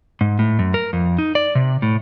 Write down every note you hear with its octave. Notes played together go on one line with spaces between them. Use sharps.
G#2
A2
F#2
A#4
F2
D#4
D5
C3
A2